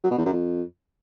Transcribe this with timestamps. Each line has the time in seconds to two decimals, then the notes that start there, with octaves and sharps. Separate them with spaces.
0.04 F#3
0.11 B2
0.18 E2
0.26 F#2
0.33 F2